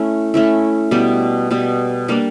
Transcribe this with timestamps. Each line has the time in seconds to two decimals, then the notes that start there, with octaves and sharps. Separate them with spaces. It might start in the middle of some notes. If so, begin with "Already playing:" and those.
Already playing: A3 C#4 E4
0.34 A3 C#4 E4
0.91 B2 G3 B3
1.51 B2 G3 B3
2.08 G3 A#3 D4